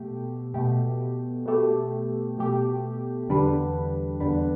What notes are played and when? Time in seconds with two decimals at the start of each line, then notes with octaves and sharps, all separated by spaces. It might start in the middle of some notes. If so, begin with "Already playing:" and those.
Already playing: B2 A3 G4
0.54 B2 A3 G4
1.46 B2 A3 G4
2.38 B2 A3 G4
3.28 E2 D3 G3 D4 B4
4.20 E2 D3 G3 D4 B4